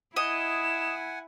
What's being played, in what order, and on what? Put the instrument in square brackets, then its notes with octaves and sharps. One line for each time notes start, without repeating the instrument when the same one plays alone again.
[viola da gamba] E4 [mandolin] D#5 [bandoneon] F#5 G#5 [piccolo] E7